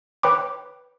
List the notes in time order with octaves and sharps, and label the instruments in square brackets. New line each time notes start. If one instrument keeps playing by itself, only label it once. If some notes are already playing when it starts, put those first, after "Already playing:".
[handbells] B4 C#5 G5 B5 D6